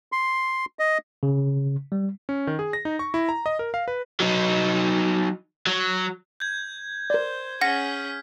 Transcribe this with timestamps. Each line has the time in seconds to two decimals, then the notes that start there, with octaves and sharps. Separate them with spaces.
0.12 C6
0.79 D#5
1.23 C#3
1.92 G3
2.29 C#4
2.47 D#3
2.59 G#4
2.73 A#6
2.85 D#4
2.99 C#6
3.14 E4
3.29 A#5
3.46 D#5
3.59 A#4
3.74 F5
3.88 B4
4.20 F#3 D#4
5.67 F#3
6.40 G6 G#6
7.10 A#4 C5 D5
7.61 C#4 G#4 F#5 F6 A#6 B6